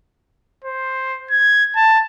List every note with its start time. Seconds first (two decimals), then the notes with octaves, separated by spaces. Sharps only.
0.64 C5
1.31 G#6
1.76 A5